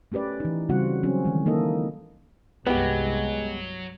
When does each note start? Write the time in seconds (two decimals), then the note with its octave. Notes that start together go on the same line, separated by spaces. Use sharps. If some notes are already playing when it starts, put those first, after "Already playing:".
0.12 A3 C#4 G4 B4 D5
0.40 E3 D#4
0.69 C#3 G3 C4 F4 F#4 F#5
1.03 F#3 C4 C#4
1.25 D#3 E3 G#3
1.46 A#3 D#4 E4 A4 D#5
2.67 C2 G2 F#3 G#3 B3 G4